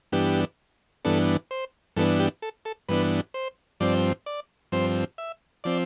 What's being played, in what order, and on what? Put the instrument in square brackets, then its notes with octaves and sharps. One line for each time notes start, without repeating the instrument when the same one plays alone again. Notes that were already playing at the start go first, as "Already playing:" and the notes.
[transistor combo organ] G2 E3 B3 D4 G4
G2 E3 B3 D4 A4
C5
G2 E3 B3 D4 A4
G4
A4
A4
G2 E3 B3 D4 B4
C5
G2 F3 C4 D5
D5
G2 F3 C4 C5
E5
F3 C4 D5